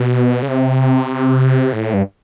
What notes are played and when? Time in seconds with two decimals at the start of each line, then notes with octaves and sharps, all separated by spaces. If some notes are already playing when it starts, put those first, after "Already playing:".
Already playing: B2
0.42 C#3
0.48 C3
1.72 A2
1.94 G2